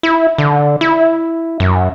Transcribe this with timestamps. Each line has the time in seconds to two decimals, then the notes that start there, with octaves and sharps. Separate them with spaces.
0.03 E4
0.38 D3
0.81 E4
1.60 F#2